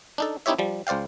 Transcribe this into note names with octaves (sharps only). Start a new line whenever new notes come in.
D4 D#4 A4
C4 D#4 E4 G4 C#5 E5
F3 G3
C#2 C5 D5 F5 G5